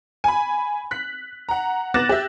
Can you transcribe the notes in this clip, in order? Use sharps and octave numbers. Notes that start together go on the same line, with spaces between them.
G#5 B5
F#6 B6
F#5 A#5
B3 D6 F#6 A6 A#6 E7
G4 E5